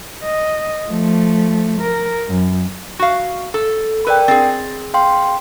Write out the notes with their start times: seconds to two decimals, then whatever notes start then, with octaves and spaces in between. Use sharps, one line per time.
0.23 D#5
0.87 F3 A3
1.81 A#4
2.28 F#2
2.99 F#4 F5
3.54 A4
4.07 A#4 B4 D5 G5
4.28 C4 G#4 A6
4.94 F5 G5 C6